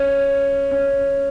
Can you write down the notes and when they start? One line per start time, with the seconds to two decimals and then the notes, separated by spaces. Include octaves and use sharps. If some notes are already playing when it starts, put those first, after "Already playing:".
Already playing: C#4
0.71 C#4